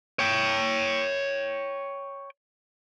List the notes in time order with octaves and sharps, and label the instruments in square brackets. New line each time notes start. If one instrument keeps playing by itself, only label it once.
[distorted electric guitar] C#5 G5